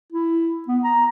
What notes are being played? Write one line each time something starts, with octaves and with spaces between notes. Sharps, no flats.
E4
B3
A#5